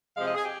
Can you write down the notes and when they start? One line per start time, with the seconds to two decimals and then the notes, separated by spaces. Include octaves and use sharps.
0.15 C3 F3 G#3 F5
0.25 D#5
0.35 G#4
0.44 G4